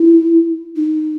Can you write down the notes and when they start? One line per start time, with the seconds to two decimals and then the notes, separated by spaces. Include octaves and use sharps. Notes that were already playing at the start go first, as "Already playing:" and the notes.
Already playing: E4
0.76 D#4